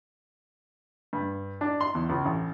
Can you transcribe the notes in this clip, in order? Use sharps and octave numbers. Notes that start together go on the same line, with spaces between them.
G2
D4
C6
E2
C#2
A1